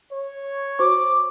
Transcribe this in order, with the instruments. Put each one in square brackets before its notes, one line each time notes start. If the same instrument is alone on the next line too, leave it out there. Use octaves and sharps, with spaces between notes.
[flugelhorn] C#5
[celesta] F#4 C5 C#6 [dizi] D6